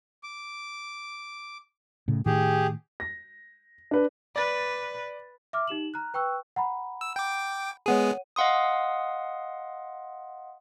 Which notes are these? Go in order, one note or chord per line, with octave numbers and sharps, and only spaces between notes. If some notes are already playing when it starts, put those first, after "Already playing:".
D6
A2 C#3
A2 D#3 G4 G#4
A#6
D4 B4
B4 D5 A6
E5 D6 F6
D#4 G4 E7 F#7
A#5 F6 F#6
B4 G5 C#6 E6 F#6
F#5 A#5 B5
E6
G5 D6
G#3 B3 G#4 C#5 F#5 D#7
D#5 F5 F#5 C6 D#6